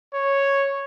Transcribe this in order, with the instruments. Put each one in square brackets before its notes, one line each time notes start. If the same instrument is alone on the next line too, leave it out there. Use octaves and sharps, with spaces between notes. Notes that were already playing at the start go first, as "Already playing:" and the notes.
[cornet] C#5